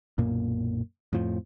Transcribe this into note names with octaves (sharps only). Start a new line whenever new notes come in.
B1 F#2 A#2 A#3
F2 A2 F3